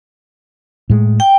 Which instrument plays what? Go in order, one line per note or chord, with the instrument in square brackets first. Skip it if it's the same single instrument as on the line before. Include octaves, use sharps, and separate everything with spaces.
[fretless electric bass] A2 G#3
[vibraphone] G5